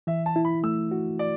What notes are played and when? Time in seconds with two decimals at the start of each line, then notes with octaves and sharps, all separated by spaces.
0.07 E3 E5
0.26 A5
0.36 E4
0.45 B5
0.64 A3 E6
0.91 F#4
1.19 D5